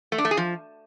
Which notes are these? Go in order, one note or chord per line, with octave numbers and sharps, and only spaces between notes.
A3
D4
A3
G#4
F3